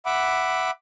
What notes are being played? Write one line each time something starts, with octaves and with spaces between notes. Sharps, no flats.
E5 F#5 B5 D6